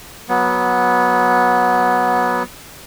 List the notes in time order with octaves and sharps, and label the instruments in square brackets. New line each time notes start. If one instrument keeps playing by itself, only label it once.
[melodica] F#3 B3